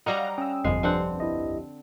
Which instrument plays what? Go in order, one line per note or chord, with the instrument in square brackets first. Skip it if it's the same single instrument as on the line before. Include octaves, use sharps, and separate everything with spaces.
[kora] G3 C#5 D#5 [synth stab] F5 F#5 A#5
[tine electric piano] C#4 G5 [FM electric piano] D#6 E6
[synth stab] G1 C2 F2 [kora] G#3 [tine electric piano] C7
[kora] D3 C4 F#5 [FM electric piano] F3 G4 B4
[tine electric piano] E4 D#5